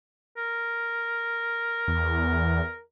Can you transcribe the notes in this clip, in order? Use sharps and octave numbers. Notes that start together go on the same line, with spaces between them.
A#4
E2